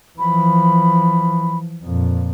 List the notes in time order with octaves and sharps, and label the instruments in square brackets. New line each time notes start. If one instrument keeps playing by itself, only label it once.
[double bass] E3 F3 [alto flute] B5
[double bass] F2 A#2